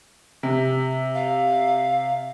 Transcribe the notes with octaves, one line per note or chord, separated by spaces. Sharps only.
C3
F5